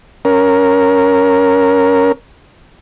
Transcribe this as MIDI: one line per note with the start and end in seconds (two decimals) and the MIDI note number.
0.25 2.12 61
0.25 2.12 70